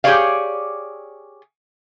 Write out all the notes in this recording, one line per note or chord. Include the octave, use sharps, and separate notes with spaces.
G4 G#4 A#4 C#5 D5 F5